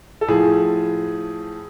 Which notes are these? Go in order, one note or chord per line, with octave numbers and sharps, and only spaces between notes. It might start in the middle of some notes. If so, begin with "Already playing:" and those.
A4
A2 F3 G#4